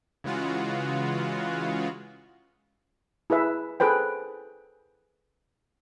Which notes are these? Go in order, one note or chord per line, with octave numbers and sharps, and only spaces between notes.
C#3 E3 G#3 F4 F#4
E4 G#4 B4 E5
G#4 A4 B4 C5 G5